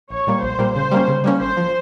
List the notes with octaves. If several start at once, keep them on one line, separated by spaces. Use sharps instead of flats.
A#1 C#5
A#2 G3 A#3
A#1 C5
A#2 G3 A#3
C#3 C5
G3 A#3 C#4
C#3
G3 A#3 C#4
G#1 C5
F3